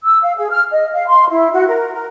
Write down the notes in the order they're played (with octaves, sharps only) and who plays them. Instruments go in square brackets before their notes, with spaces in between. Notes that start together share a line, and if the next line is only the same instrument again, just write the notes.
[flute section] E6
F5
G#4
F6
D#5
F5
C6
E4
F#4
A#4
A#4